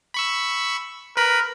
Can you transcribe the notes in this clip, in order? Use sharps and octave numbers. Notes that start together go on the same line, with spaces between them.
B5 C#6 E6
A#4 B4 B5